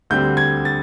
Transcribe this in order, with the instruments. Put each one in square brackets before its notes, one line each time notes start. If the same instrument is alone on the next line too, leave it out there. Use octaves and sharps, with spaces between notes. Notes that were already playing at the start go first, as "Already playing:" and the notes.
[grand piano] D2 D3 G3 C4 G6
G#6
A6